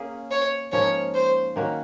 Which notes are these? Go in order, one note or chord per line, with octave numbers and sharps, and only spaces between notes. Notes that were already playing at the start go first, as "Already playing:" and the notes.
Already playing: A#3 C#4 G#4
C#5
G#2 F3 A#3 C#4 C#5
C5
D#3 A#3 C#4 F#4